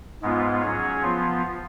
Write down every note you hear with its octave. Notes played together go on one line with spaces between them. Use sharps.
G#2 G#3 B3 F4
F#3 C#4 G#4 C#5
F3 B3 F4